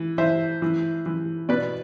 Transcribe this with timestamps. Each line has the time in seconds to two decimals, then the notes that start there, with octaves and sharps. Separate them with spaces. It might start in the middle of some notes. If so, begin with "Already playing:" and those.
Already playing: E3
0.18 E3 C5 E5
0.62 E3
1.06 E3
1.49 B2 B4 D5